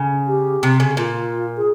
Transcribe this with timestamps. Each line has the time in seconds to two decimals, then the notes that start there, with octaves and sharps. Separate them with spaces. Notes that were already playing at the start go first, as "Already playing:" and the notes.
Already playing: C#3
0.28 G4
0.63 C3
0.80 C#3
0.97 A#2 F4
1.57 G#4